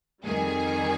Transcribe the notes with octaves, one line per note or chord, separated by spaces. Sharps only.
F2 D#3 G3 G#4 G#5